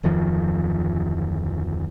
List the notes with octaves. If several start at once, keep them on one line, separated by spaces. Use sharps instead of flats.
D1 F2 D#3 F3